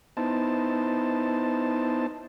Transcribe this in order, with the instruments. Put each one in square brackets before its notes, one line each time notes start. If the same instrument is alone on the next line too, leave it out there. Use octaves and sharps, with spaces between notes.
[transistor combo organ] B3 D#4 E4 C5 A5